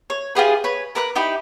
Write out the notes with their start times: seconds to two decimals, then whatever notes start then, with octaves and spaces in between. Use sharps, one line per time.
0.10 C#5
0.35 F4 G4 G#4 B4
0.64 B4 C#5
0.95 A#4 B4 D6 F#6
1.15 D#4 E4 G4 B5